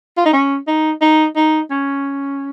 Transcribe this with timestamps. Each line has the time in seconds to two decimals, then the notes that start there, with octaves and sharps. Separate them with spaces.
0.18 F4
0.25 D#4
0.33 C#4
0.68 D#4
1.01 D#4
1.36 D#4
1.71 C#4